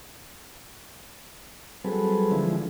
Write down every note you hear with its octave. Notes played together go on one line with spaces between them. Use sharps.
F#3 G3 C4 G#4 A4 B4
D3 F3 G#3 E4